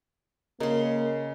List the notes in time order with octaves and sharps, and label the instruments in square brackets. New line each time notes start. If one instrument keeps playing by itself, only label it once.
[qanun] C#3 C6 [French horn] A#3 [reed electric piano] A#4 D#5